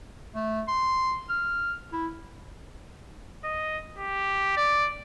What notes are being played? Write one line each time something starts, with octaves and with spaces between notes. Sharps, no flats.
A3
C6
F6
E4
D#5
G4
D5